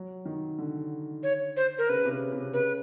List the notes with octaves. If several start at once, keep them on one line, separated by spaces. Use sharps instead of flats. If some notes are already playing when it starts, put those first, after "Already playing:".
Already playing: F#3
D#3
D3
C#5
C5
A#4
C#3 B4
C3
C#3
C3
C#3 B4